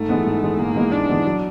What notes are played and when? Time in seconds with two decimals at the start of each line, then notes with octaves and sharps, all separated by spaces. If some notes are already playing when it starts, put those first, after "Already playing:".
Already playing: G#2 A3
0.09 E3 G#3 B3
0.26 G#2
0.42 E3 G#3 B3
0.59 G#2 A#3
0.76 E3 G#3 B3
0.92 G#2 D4
1.09 E3 G#3 B3
1.25 F#3